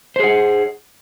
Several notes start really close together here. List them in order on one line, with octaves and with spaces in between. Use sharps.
C5 G#4 F#5